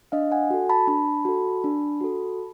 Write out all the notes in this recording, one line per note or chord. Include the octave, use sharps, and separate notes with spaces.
D4 D#5 F5
F#5 G#5
F#4 A4
A5 B5
D4 A5 B5
F#4 A4
D4
F#4 A4